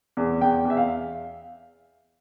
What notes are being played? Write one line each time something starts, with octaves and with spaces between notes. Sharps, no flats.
E2
E2 G5
E2 E5
F5